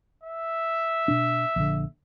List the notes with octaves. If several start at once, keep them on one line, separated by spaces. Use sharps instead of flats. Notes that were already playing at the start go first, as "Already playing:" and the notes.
E5
B2 D4
A#1 D3